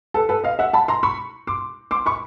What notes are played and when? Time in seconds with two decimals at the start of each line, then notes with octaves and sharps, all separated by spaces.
0.14 A4 B4
0.29 A4 B4
0.44 D#5 F5
0.59 E5 F#5
0.73 A5 B5
0.88 A#5 C6
1.03 B5 C#6
1.47 C6 D6
1.91 C6 D6
2.06 B5 C#6